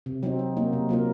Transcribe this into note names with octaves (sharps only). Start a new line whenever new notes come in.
C3
F#3 C4 D#4
F#3
A#3 D#4
C3
F#3 A#3 F4 A#4